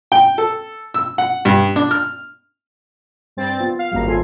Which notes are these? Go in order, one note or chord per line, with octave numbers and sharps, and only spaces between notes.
G5
A4
E6
F#5
G2
D4
F6
G2 C4 A6
B3 F4
F5
G#1 F#2 G3 A#3 A#5 C7
F4 A4 G#5